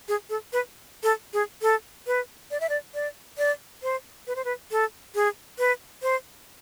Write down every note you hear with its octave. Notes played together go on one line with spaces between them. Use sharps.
G#4
A4
B4
A4
G#4
A4
B4
D5
E5
D5
D5
D5
C5
B4
C5
B4
A4
G#4
B4
C5